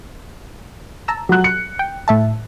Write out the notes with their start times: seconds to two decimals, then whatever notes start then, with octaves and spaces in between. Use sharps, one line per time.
1.08 A5 A#5 E6
1.29 F#3 F#6
1.44 C#7
1.79 G5
2.08 A2 E5 A5